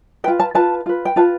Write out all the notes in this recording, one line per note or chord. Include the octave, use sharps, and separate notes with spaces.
F4 B4 G5
A5
F4 B4 A5
F4 B4
G5
F4 B4 A5